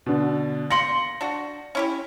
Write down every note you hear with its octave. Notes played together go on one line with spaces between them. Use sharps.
B2 D3
A#3 C6 A#6 C#7 F#7
D4 F#4
C#4 E4 G4